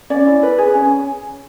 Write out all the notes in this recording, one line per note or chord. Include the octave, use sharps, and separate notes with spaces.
C#4 D5
E4
B4
G#4
C#4